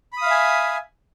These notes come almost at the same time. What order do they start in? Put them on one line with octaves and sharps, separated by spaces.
B5 D#6 F5 E5 G#5